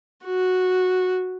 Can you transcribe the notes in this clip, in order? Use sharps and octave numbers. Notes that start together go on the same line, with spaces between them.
F#4